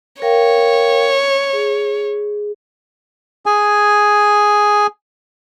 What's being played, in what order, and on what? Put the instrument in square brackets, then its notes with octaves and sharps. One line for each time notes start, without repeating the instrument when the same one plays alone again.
[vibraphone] A#4 F5 G5 [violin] C#5
[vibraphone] G#4
[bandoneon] G#4 G#5